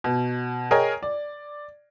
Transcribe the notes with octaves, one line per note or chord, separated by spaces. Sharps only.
B2
G#4 A#4 C#5 D#5 G5 G#5
D5